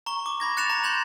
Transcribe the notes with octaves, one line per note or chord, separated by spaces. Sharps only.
A#5 C#6 G7
D6
B5 G#6 A#6
F#6 A6 C#7 E7 F7
A#5
C6 G6 G#6 A#6 F7 F#7